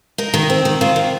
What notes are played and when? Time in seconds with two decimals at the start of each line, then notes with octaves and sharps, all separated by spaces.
0.18 D#4 A#4
0.34 D#3
0.50 C4
0.65 D#3
0.81 D#3 F4
0.96 D#3